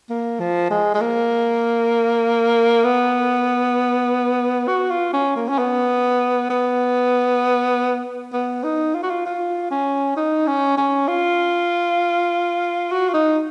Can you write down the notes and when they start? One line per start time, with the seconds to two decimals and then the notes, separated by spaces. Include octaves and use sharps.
0.10 A#3
0.40 F3
0.71 G#3
0.95 G#3
1.02 A#3
2.85 B3
4.68 F#4
4.90 F4
5.14 C#4
5.36 A#3
5.49 C#4
5.59 B3
6.50 B3
8.33 B3
8.64 D#4
8.95 F4
9.03 F#4
9.11 F4
9.26 F4
9.71 C#4
10.17 D#4
10.47 C#4
10.78 C#4
11.08 F4
12.92 F#4
13.09 F4
13.14 D#4